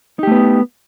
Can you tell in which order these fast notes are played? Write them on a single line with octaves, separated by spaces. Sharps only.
D#4 G4 A3 B3